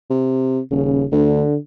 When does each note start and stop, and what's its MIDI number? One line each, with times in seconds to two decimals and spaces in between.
0.10 0.60 48
0.71 1.06 27
0.71 1.05 49
1.12 1.44 38
1.12 1.56 50